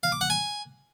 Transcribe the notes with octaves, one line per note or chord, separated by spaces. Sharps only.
F5
D6
F#5
G#5